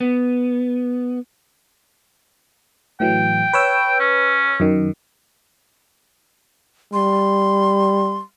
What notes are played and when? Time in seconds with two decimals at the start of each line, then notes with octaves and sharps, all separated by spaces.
0.01 B3
3.00 A2 E3 F#3 G5
3.53 B4 C#5 E6
3.99 C#4
4.60 F#2 D#3
6.93 G3 C6